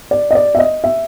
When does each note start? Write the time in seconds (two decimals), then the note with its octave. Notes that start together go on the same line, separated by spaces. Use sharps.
0.11 D5
0.31 D#5
0.35 D5
0.55 E5
0.59 D#5
0.84 E5